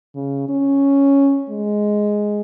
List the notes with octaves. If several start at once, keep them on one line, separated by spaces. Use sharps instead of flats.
C#3
C#4
G#3